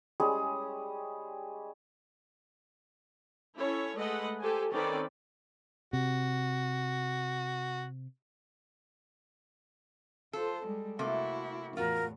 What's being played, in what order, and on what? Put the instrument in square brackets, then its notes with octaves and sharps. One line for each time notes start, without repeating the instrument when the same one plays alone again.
[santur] G3 G#3 C#4 G#4
[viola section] C#4 E4 A4 C#5
G#3 A3 B4 D#5 F#5
G4 A4 C5 G#5
D#3 C4 C#4 A4 B4 D5
[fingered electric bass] C3 [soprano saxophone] F#4
[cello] F4 C5 [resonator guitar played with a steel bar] A4
[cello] G3 G#3
[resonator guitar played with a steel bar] C3 A3 A#3 [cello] E4 F#4
[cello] E2 A2 [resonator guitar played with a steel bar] F4 F#4 [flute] A#4